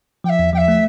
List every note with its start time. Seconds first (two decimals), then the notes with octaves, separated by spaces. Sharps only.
0.24 F3 G5
0.29 E5
0.39 E2
0.53 F3 G5
0.57 E5
0.68 A3